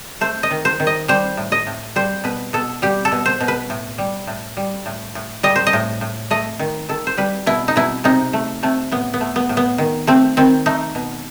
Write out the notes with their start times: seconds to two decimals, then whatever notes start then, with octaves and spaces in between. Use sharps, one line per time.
0.21 A3 C5
0.43 D#5
0.51 D#3
0.65 C5
0.80 D#3
0.87 D#5
1.08 G3 C5
1.37 A2
1.52 D#5
1.67 A2
1.96 G3 C5
2.24 B2 B4
2.53 B2 A4
2.82 G3 G4
3.05 A4
3.12 B2
3.26 C5
3.40 B2
3.48 B4
3.70 A2
3.98 G3
4.27 A2
4.57 G3
4.86 A2
5.15 A2
5.43 G3 D#5
5.56 C5
5.67 D#5
5.73 A2
6.01 A2
6.31 A3 D#5
6.59 D#3
6.89 D#3 A4
7.07 C5
7.17 G3 B4
7.46 B2 E4
7.68 D#4
7.76 B2 E4
8.04 C3 D#4
8.33 A3
8.63 C3 A3
8.91 A2 B3
9.14 B3
9.21 A3
9.36 B3
9.49 A2
9.57 B3
9.78 D#3
10.07 A3 C4
10.37 D#3 C4
10.66 A3 D#4
10.95 B2